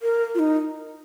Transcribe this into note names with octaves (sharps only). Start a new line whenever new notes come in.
A#4
F4
D#4